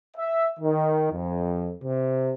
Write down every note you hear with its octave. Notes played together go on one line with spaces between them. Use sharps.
E5
D#3
F2
C3